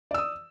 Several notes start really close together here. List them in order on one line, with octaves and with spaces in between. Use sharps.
D5 E6 D#6